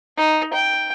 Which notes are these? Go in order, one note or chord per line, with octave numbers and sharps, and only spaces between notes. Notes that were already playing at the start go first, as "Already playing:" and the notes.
D#4
G5